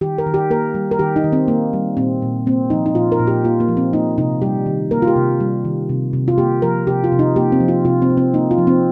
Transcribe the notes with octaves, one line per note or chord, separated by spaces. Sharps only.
D#3 G4
A#4
D#3
G4
A#3 A#4
G3
A#4
D#3 G4
D#4
D#3
C4
A#3
G3
A#2 C4
A#2
A#3 C4
F3 D#4
D#4
A#2 F4
A#4
A#2
G4
A#3 F4
A#3
F3
C4
A#3 D#4
C3 D#4
G3 G4
D#3
A#3 A#4
F4
G4
C3
G3
D#3
C3
C3
F4
A#3 G4
F3 A#4
C3 G4
F4
C3
D#4
A#3 G4
C4
F3
F4
C3 F4
C4
C3
C4
A#3 D#4
F4
F3
C4